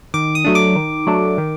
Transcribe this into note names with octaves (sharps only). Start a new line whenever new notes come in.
D#3 D6
D#6
F#3 A3 D4
D6
D#3
F#3 A3 D4
D#3